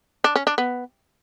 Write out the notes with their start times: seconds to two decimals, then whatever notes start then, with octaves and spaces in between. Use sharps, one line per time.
0.24 D4
0.36 C#4
0.47 D4
0.58 B3